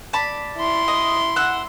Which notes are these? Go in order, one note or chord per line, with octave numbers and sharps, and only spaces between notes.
D5 A5 B5
E4 C6
D#5
F#5 E6